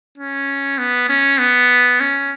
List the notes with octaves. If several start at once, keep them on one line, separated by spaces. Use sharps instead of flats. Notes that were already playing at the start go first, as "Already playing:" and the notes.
C#4
B3
C#4
B3
C#4